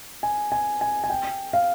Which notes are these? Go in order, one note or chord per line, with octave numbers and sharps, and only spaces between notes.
G#5
G#5
G#5
G#5
G5
F5